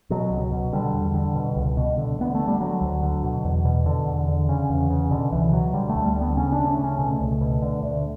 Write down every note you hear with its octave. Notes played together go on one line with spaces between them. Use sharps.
B2 F#3
C#2
B2
D3 G3
E2
D3
B2
C#2
B2
D3
D2 B3
D3 A3
G3
D3 F#3
D2
D3
B2
E2
B2
D3
E2
D3
C#3
E2
C#3
B2 D3
C#2 E3
B2 F#3
D3 G3
A3
D2
G3
D3
B3
C#3 C#4
D4
D2
C#4
C#3
C#4
B2 A3
C#2
B2
D3
D2